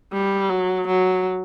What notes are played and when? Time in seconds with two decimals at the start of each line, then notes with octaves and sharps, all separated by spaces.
0.13 G3
0.50 F#3
0.88 F#3